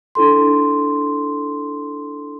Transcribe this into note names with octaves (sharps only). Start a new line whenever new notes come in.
D4 E4 A4 C6